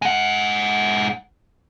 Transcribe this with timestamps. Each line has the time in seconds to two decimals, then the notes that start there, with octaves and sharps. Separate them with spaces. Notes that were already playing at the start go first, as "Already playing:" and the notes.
0.02 G#3 F#5